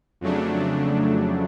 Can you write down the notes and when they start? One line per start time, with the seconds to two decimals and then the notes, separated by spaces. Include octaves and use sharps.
0.21 F2 C#3 F#3 A3 D4